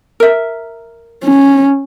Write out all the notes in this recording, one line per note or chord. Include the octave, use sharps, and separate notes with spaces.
A#4 E5
C#4